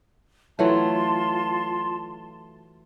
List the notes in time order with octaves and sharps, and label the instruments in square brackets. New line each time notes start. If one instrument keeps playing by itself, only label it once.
[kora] E3 F#3 A3 [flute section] F4 A5 C6